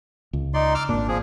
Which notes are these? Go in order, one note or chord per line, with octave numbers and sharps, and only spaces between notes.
C#2
D#4 D5 C6
D6 E6 F6
G#1 A#2 D4
F3 G#4